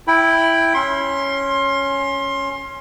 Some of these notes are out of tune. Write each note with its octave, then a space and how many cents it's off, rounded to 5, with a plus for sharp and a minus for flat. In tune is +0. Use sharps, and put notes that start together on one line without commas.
E4 +0 G5 +0 B5 +0
C#4 +0 C6 +25